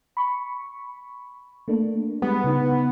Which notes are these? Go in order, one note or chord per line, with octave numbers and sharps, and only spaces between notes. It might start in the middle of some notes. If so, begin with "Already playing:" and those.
B5 C#6
A3 A#3 D4
G3 G#3 B3
C#3 D#4